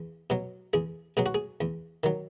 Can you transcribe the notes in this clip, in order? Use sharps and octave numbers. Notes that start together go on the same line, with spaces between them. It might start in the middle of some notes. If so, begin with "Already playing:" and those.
Already playing: E2
B2 F#3
E2 G#4
B2 F#3 G#4
F#4
G#4
E2
D#3 F#3